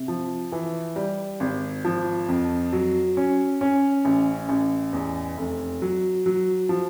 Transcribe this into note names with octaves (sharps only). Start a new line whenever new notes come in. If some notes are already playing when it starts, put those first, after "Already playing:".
Already playing: C3
F3
E3
G3
G#1
F3
F2
F#3
C#4
C#4
A1
A1
E2
F1
F#3
F#3
F3